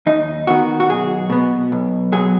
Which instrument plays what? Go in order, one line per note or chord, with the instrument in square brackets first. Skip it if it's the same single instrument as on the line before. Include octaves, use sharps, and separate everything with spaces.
[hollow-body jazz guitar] D#2 D#4
D#3 B3 F#4
F#4
B1 G#4
B2 B3
B1
B2 F#3 G#4